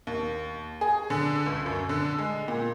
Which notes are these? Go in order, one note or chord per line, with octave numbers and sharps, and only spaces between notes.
D#2
G#4
D3
C#2
F#2
D3
G#3
A#2